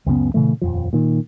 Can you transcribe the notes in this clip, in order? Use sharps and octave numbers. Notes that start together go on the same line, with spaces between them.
C#2 F#2 C#3 B3
A#2 C#3 E3 A3
D#1 F2 F3
A#2 D#3